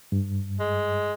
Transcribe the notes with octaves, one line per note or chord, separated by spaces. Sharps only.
G2
G#3